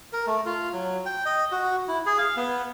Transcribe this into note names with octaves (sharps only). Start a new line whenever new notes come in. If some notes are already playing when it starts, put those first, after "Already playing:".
A#4
A3
F4
F#3
G5
D#5
F#4
E4
G#4
F5
B3